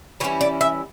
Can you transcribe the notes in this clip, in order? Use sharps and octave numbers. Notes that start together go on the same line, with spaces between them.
E3 G3 C#4 E4 C#5
D5
E5